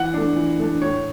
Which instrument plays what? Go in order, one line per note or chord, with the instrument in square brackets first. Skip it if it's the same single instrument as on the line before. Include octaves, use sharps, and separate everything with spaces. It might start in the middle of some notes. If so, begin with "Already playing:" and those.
Already playing: [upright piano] E3 F#5
A3 D4
E3
A3 D4
A2 C#5